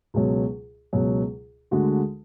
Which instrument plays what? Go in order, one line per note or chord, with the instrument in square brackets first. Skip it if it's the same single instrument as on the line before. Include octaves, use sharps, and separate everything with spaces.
[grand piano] C#2 B2 F#3
C#2 B2 F#3
D2 D3 G#3 D4 F#4